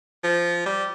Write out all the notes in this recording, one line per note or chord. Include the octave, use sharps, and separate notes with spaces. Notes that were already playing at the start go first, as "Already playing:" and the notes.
F3
G3